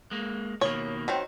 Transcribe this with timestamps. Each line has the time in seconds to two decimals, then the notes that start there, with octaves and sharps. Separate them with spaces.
0.11 G#3 A#3
0.61 B2 D#3 A#3 C#5
1.08 D#3 F#3 C4